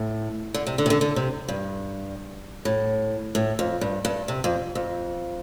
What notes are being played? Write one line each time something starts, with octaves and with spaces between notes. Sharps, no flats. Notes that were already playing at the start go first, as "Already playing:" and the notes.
Already playing: A2
D3
C3
D3
C3
D3
D3
C3
G2
A2
A2
F2
G2
G2
C3
F2
F2